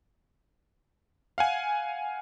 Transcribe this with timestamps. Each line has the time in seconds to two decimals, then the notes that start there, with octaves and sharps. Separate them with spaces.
1.38 F5 F#5 G#5